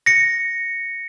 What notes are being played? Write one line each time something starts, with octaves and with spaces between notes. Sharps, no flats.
A#6 C#7